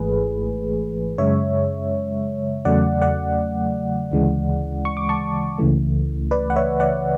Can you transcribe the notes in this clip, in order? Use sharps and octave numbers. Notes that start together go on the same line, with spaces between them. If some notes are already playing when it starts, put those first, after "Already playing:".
Already playing: G#1 G#2 E3 A3 G#4 B4
F#2 C#3 G#3 C#5 E5
E2 C#3 F#3 A3 D5 F#5
D5 F#5
D2 C#3 E3 G#3
C#6
D6
A5 C#6
C#2 C#3 E3 A3
B4 D5
F#5
C#5 E5
D5 F#5